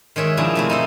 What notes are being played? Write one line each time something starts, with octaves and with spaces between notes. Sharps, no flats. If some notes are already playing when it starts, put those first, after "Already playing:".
D#3 G#3 C#5 E5
B2 F3 D4 E4 F4 G#4
C3 A3 E4
D#4 E4 A4 C5